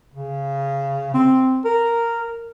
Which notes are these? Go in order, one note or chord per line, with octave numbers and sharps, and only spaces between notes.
C#3
C4
A#4